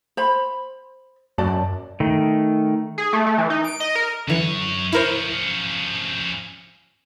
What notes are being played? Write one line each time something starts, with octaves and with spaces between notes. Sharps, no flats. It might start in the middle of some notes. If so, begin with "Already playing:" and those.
C5 B5
F#2 F#4 D5 A5
D#3 A3
G#4
A3
A3
E3
D#4
D7
D#5
A#4
F#2 D3 E3 C#5
F3 C#4 E4 A#4 C5